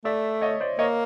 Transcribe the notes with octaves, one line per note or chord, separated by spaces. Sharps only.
A3 D5 E5
C#5 D#5
C5 D5
A#3 C#5 D#5